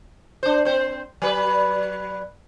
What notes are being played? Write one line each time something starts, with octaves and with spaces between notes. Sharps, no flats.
D4 C5
C4 C5
F#3 B4